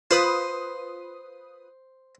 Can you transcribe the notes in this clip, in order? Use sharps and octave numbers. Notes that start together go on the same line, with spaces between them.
F4 B4 C5 D#6